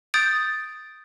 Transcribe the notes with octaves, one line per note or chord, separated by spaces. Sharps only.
D#6 G6 A6 D7